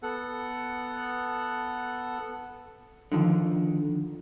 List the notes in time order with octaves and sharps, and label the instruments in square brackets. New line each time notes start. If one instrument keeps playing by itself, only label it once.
[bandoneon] B3 A4 F#5
[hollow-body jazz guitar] D3 D#3 F3